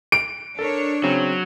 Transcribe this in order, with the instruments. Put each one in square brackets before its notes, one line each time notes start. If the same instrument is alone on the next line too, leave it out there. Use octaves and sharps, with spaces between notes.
[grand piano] D7
[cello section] D4 C#5 [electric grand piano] A4 A#4
[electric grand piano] C#3 C4 [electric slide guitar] F#3